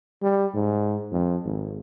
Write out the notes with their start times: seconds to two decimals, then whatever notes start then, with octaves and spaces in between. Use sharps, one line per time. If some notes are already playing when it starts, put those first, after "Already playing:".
0.22 G3
0.54 G#2
1.12 F2
1.45 G#1